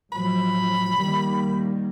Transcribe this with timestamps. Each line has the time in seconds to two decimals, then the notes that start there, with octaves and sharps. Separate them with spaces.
0.12 A2 F3 F#3 B5
0.98 D#3 G3 A#3